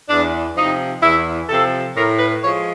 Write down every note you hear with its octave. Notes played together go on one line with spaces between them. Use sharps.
E2 D4
C3 F3 D#4
E2 E4
C3 F3 A4
A2 A#4
B4
F3 G#3 C#5